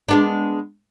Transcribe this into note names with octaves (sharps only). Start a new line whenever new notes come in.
G#3 B3 D4